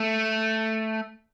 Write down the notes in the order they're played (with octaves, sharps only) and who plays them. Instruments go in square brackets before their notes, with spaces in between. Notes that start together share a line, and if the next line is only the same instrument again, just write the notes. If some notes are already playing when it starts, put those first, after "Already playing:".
Already playing: [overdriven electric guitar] A3